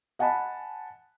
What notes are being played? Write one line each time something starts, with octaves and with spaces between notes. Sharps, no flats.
D#5 F#5 G#5 A5 B5